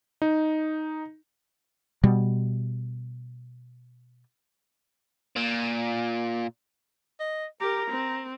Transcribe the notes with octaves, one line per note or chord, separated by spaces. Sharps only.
D#4
B2 G3
A#2
D#5
G4 A#4 A#5
C4